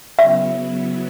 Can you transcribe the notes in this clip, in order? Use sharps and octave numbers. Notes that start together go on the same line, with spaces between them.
C#3 F#3 B3 E4 E5